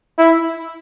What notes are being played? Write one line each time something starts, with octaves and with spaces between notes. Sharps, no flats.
E4